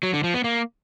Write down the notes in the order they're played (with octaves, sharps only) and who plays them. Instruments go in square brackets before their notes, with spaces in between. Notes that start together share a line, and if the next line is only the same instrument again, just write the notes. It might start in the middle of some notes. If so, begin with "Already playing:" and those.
[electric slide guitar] F#3
D3
F3
B3
A#3